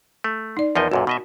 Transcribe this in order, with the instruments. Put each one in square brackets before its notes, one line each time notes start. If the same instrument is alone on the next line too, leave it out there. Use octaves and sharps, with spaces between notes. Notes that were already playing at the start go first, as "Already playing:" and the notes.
[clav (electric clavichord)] A3
[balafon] D#4 D5
[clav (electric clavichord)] E2 F3 D#5 [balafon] A#4 G#5
[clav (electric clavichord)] B1 F#2 A#2 [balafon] F#4
[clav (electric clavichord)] B2 D#5 E5